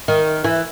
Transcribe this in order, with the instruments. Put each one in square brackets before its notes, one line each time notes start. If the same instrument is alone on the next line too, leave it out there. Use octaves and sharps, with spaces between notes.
[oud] D#3
E3